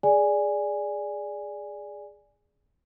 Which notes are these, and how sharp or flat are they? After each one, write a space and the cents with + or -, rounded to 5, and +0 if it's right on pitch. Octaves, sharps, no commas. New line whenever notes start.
G#4 +0 D5 +0 G#5 -5